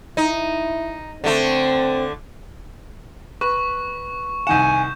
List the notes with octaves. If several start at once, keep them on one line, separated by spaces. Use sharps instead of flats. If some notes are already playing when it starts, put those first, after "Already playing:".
D#4 E4
D3 A3 C4
B4 C#6
C2 D#3 F#5 G#5 G6 E7